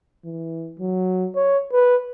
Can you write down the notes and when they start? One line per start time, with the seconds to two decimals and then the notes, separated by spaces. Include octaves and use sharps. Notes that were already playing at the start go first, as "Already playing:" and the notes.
0.25 E3
0.79 F#3
1.35 C#5
1.73 B4